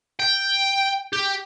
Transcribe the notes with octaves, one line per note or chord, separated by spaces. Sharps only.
G5
G4